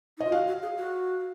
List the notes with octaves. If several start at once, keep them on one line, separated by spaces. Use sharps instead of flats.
D#4
F4 D#5
F#4 F5
F#4
G#4
F#4